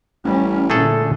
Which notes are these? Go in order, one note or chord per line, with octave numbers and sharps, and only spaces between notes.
A1 G3 C#4
A#2 D3 A3 G#4 A4